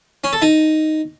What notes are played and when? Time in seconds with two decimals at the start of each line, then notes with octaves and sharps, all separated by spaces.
0.24 C#4
0.33 A4
0.42 D#4